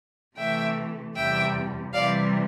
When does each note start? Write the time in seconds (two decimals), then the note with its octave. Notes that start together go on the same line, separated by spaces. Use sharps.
0.37 C3 E3 A3 E5 G5
1.16 E2 C3 G3 E5 G5
1.93 C3 E3 G3 D5 F5